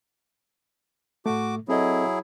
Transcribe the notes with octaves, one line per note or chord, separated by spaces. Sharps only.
A2 A3 F#4 D6
F#3 C4 E4 G#4 A4 D#5